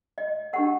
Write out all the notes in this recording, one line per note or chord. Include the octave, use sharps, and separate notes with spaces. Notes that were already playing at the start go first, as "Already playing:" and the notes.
D#5
D4 G4 A#4 F#5